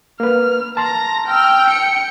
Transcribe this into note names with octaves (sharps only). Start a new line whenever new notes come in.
A#3 B4 F6
A5 A#5 C6 A#6
G5 E6 F6
C#7